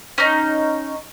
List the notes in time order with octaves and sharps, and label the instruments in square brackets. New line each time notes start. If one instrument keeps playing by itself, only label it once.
[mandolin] C#4 D#4